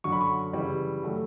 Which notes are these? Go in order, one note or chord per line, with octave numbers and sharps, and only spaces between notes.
F#2 D3 F#3 C#6
B5
C#6
C#3 E3 G3
F#3 A3